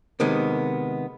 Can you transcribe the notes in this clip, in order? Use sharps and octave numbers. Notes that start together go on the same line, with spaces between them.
C3 D#3 G#3 B3